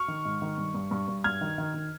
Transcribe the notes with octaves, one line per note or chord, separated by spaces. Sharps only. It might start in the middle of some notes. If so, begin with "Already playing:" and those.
Already playing: C#6 F6
D#3
G#2
D#3
G2
G2
G2
G2
G2 F6 G#6
D#3
D#3
D#3